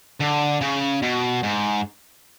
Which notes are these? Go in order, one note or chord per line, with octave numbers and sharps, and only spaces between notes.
D3
C#3
B2
G#2